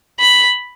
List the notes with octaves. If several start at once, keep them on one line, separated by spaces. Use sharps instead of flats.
B5